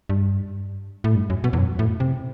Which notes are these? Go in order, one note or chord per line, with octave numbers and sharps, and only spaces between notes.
G2
A2
G2
F#2
B2
E2
F#2
A2
C3